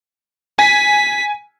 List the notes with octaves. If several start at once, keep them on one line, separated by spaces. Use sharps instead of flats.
G#5 B6